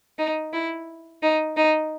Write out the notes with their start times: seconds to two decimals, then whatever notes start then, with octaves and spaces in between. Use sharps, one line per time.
0.19 D#4
0.53 E4
1.23 D#4
1.57 D#4